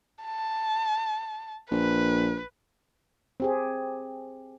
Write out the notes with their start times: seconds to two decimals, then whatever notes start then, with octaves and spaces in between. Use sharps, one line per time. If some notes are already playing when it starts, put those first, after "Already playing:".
0.24 A5
1.71 A#1 B4
3.40 C4 G4 G#4